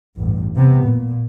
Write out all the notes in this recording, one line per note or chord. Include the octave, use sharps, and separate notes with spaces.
A1 E2 G2
C3 B3
A#2